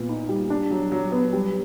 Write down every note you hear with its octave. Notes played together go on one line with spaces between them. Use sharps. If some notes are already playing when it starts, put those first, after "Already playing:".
Already playing: A#2 B3
D#4
G3
D4
F#3
F#3
B3
G3